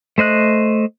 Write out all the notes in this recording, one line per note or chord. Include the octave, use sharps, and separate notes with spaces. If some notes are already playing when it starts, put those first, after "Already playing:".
A3 C5 D#5 F#6